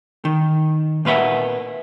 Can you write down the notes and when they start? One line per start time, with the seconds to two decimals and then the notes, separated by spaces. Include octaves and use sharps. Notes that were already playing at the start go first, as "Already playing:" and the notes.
0.25 D#3
1.05 A#2 A#3 B4 E5 F#5